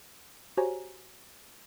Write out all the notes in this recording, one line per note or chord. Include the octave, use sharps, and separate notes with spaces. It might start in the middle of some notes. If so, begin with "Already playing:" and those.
F#4 G4 C5 C#5 G#5 A#5